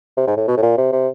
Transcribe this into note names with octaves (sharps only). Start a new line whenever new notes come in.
C3
G#2
A2
B2
A2
A#2
C3
C3